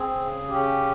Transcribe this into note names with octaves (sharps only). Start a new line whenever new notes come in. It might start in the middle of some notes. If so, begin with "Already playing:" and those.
Already playing: C4 G#4
C#3
C#4 G4